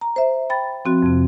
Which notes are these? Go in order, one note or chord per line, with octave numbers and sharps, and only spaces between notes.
A#5
C5 E5
G5 B5 A6
F3 C4 F#4
F2 C3